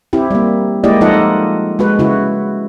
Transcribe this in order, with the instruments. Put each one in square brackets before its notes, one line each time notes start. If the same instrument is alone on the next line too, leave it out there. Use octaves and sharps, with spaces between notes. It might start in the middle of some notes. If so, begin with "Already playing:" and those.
[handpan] C4 E4 G4
G3 A#3
G#3 A#3 E4 G4 D5 D#5
F3 D#4 F4 A4 D#5 F#5
G#3 F#4 B4
C#3 E4 F#4